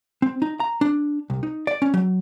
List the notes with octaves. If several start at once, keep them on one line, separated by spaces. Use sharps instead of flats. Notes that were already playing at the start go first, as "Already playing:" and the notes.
C4
D#4
A#5
D4
C2
D#4
D5
C#4
F#3